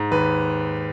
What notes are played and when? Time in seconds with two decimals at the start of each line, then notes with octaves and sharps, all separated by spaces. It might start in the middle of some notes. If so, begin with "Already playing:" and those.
Already playing: G#2
0.11 D#2 B4